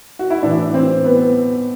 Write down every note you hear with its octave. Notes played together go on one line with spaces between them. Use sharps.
F#4
E4
A2 E3 D4
C4
B3